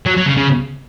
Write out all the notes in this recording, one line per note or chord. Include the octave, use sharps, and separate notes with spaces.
F#3
F#3
C#3
C#3